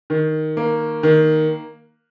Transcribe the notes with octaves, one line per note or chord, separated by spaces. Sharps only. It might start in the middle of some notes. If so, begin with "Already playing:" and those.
D#3
A#3
D#3